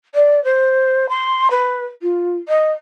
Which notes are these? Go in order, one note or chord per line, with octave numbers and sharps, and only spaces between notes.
D5
C5
C6
B4
F4
D#5